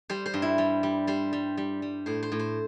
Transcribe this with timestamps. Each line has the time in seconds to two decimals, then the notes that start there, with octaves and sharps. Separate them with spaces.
0.10 G3 C5
0.26 C5
0.34 G2
0.42 E4
0.58 G3
0.83 G3
1.07 G3 C5
1.33 G3
1.57 G3
1.82 G3
2.06 A2 C5
2.23 C5
2.32 A2
2.39 C5